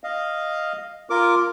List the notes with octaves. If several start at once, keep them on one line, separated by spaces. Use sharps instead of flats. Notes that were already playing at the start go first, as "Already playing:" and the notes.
D#5 F5
F4 A#4 D6